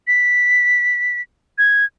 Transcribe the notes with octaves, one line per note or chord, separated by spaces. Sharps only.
B6
G#6